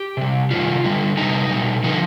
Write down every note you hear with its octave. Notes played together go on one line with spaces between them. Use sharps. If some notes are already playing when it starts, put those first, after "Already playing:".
Already playing: G4
C3 G3
C3 D#3 G3 F4
D3 G3
C3 G3 D#4
B2 G3
D3 F3 D#4